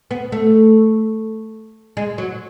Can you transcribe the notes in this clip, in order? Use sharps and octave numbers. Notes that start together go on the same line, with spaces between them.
B3
A3
G#3
F#3